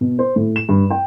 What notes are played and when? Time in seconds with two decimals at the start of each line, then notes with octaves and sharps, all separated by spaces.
0.01 B2
0.19 C5
0.36 A2
0.56 E7
0.69 G2
0.91 G5